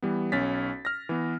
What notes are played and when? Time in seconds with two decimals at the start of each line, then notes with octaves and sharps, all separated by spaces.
0.02 E3 G3 B3
0.32 B1 C#4 A6 B6
0.85 F6 A#6
1.09 E3 B3